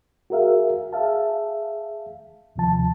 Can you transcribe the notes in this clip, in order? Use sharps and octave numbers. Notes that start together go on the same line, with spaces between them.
F#4 G#4 A#4 E5 F5
G#4 E5 F5 A5
D#2 C3 F3 A5